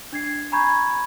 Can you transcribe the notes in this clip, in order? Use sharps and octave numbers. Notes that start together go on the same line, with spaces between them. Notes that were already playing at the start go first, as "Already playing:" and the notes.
D4 G#6 C7
G#5 A#5 B5 C#6 G6 G#6